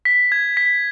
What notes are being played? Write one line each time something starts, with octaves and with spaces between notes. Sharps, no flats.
B6
G#6
B6